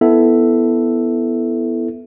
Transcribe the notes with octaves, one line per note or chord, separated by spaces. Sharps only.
B3 E4 A4 E5